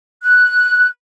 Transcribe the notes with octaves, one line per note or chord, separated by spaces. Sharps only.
F#6